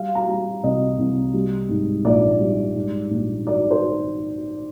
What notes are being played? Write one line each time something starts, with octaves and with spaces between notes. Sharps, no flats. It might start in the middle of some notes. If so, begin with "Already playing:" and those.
Already playing: G3 F5
A#5
G3
C2 D#5
C2
G3
G#2
A#1 D5
G3
G#2
A#1
D#3 D5
C5